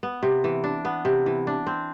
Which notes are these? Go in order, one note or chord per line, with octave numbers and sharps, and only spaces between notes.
B3
C3
E3
D4
B3
C3
E3
D4
C4